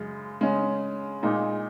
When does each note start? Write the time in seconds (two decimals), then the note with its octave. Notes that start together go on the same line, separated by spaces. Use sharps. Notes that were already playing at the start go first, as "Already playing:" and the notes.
Already playing: F#2 C#3 G#3
0.41 C#3 G#3 C#4
1.23 A#2 G#3 D#4